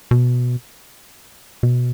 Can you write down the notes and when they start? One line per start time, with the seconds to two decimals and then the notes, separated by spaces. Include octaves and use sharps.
0.11 B2
1.63 B2